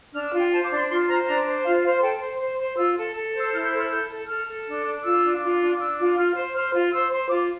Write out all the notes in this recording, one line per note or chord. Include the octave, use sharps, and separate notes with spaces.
D4 F6
E6
F4
G5
C5 A5
D6
D4
C6
F4 C6
C5 A#5
D4 A#5
C5
F4 F5
C5 F5
A4 G5
C5
C5
C5
F4 E6
A4
A4
C5
E6
E4 F6
G6
A4
F6
A4 G6
A4
A4 F6
A4
D4
D4
F4 E6
D4
F4
D4
D4 E6
F4
F4 F6
C5
C5 F6
F4
C5 E6
C5
F4 D6